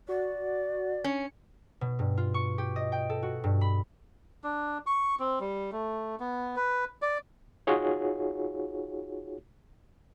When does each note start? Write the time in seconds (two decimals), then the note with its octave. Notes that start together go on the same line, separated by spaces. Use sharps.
0.09 F#4 D5
1.04 C#4 C#7
1.81 B2
1.99 G2
2.17 F4
2.34 C#6
2.58 G4
2.76 D#5
2.92 G5
3.10 A4
3.23 F#4
3.44 G2
3.61 B5
4.44 D4
4.86 C#6
5.20 C4
5.40 G3
5.72 A3
6.20 B3
6.56 B4
7.02 D5
7.67 D#4 F4 F#4 G#4 C#5